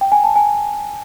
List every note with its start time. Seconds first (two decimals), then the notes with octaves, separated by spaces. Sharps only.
0.01 G5
0.12 G#5
0.24 A5
0.36 G#5